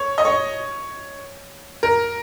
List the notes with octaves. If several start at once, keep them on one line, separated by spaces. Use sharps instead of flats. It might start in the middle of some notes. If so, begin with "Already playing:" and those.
Already playing: C#5
D#5
C#5
A#4